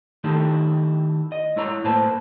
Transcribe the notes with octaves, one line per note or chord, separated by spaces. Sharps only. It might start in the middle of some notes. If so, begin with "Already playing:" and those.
D#3 A3 D#4 E4 G4 A4
D#5
G#3 E4 C#5 A#5
A2 A3 A#3 B4 C5 A5